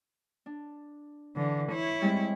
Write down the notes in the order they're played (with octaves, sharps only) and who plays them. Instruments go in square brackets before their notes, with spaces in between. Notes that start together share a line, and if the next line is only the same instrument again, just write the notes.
[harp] D4
[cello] D3 E3
E4 C#5
[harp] G3 G#3 C4